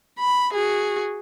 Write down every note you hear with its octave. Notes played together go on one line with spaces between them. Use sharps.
B5
F#4 G#4